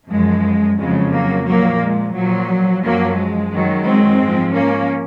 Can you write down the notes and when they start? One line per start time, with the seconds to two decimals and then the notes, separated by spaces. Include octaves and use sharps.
0.10 F#2 F3 G#3
0.78 F2 C#3 F#3 G#3
1.13 F#3 A#3
1.47 A#2 F3 F#3 A#3
1.81 G#3
2.15 A#2 F3 F#3
2.84 F#2 F3 F#3 A#3
3.18 G#3
3.52 F#2 D#3 F#3
3.86 G#3 C4
4.21 G#2 F3
4.55 A#3 C#4